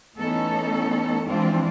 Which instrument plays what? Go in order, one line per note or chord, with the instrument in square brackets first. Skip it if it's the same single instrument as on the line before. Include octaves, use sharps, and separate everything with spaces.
[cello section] E3 A3 B3 C#4 D#4 A4
E3 F3 G#3 C4 D4 F4